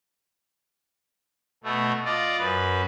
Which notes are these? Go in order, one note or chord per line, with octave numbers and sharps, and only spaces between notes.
B2 A3
F4 D5 D#5
F#2 B4